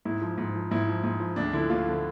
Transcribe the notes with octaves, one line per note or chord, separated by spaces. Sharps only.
G#2 E4
F3
G#2
F3
G#2 E4
F3
G#2
F3
D2 D4
D3 F3 E4
D2 F4
D3 F3